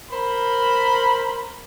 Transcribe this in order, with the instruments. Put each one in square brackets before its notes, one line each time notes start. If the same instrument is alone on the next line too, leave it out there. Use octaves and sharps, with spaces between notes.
[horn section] A#4 C5 B5